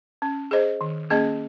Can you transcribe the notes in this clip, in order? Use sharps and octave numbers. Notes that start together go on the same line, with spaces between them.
C#4
G#4 C5 D#5
D#3
A#3 C#4 G#4 D#5